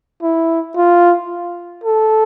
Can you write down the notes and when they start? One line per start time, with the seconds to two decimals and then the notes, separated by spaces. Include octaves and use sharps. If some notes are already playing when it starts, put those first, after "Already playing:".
0.22 E4
0.77 F4
1.84 A4